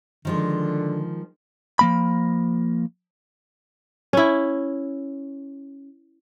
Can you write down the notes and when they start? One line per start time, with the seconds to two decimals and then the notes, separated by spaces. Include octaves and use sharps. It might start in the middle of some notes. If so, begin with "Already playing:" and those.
0.25 D3 D#3 F3 G#3
1.79 F3 A#3 B5
4.13 C#4 E4